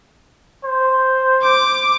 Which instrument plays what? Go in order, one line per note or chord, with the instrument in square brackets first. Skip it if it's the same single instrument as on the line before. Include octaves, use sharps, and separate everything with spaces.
[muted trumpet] C5
[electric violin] D6